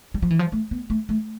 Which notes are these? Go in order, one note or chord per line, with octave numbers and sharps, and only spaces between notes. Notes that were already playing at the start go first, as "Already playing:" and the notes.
G3
F3
E3
F3
A3
B3
A3
A3